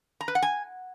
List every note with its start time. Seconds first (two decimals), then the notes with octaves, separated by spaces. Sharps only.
0.21 A#5
0.28 B4
0.35 F#5
0.42 G#5